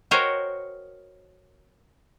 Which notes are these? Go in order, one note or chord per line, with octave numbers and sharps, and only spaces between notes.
F#4 A#4 C5 C#5 D#5 G5